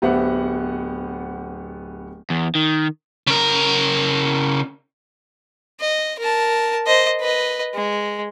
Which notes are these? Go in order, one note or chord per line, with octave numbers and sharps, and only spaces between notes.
D1 B3 G4 C5 E5 F#5
E2
D#3
C#3 A#4
D#5
A#4 A5
C5 D#5
B4 D#5
G#3